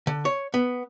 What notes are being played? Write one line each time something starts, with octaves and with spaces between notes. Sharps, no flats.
D3
C#5
B3